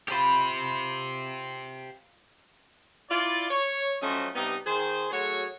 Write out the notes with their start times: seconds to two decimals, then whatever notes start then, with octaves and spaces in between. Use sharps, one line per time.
0.08 F4 G4 C5 B5 G6
3.10 E4 F4 D5
3.50 C#5
4.02 F3 F#3 A3 C#4 C5 D#5
4.35 G2 C3 G3 B3 D#4
4.66 D#3 G#4 C5
5.11 F#3 A3 F#4 G#4 C#5